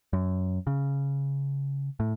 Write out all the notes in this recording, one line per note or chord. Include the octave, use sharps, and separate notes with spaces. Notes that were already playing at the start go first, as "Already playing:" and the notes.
F#2
C#3
A2